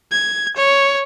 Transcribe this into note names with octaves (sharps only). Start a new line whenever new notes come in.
G#6
C#5